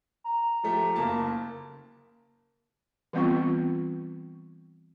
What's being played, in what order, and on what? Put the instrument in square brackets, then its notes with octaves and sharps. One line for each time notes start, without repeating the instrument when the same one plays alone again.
[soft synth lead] A#5
[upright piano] F3 A3 G4
F#1 A#3 A5
[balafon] E3 G3 B3 C4 F4 C#6